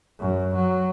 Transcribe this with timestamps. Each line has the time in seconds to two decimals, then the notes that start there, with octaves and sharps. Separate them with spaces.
0.19 F#2
0.54 F#3